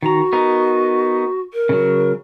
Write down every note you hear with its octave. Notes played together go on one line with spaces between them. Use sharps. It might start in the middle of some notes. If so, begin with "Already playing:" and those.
D#3 F#4 A#5
B3 D#4 A#4
A#4
C#3 F#3